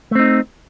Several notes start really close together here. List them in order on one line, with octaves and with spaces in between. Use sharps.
A3 C4 D#4